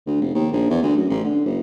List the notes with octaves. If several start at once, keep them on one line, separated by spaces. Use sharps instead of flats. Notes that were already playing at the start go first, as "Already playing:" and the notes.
D2
F1
D#2
A#1
E2
D2
F#2
A1
D3
F#1